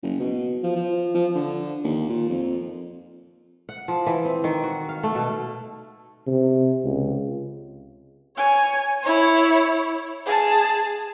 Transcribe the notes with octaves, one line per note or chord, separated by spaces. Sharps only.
F#1
B2
F3
F3
F3
D3
D#2
A#2
F2
F#5
F3
E3
C4
D#3
F#4
F5
A3
B2
C3
C#2
C#5 G#5
E4 C#5
G#4 A5